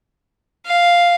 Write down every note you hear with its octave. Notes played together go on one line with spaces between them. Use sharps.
F5